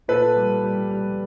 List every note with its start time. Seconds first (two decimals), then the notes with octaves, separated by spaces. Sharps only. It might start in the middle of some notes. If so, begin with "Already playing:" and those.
0.08 A#2 A4 B4
0.36 G3
0.64 G3
0.91 G3